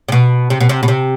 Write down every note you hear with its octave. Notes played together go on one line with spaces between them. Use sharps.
C3
B2
C3
B2
C3
B2
C3